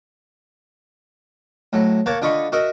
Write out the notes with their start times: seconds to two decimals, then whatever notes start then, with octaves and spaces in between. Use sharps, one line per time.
1.73 A2 F#3
2.06 A#3 A#4 C#5 F#5 A5
2.22 D3 F4 D#5 B5 C#6
2.52 F#4 A#4 D#5 E5